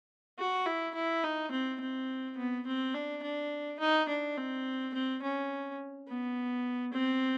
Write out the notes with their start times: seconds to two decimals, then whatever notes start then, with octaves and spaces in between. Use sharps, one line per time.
0.38 F#4
0.66 E4
0.94 E4
1.24 D#4
1.51 C4
1.80 C4
2.37 B3
2.66 C4
2.94 D4
3.22 D4
3.80 D#4
4.08 D4
4.37 C4
4.94 C4
5.22 C#4
6.07 B3
6.93 C4